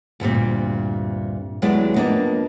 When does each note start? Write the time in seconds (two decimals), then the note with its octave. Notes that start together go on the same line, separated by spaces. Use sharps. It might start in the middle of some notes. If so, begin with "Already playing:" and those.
0.20 D2 G2 A#2 C4
1.62 D#2 F#3 G#3 B3 E4 D5
1.96 F2 A#3 B3 D4 D#5